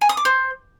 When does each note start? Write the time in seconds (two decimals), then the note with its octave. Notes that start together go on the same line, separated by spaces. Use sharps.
0.01 G#5
0.09 D#6
0.17 D6
0.25 C5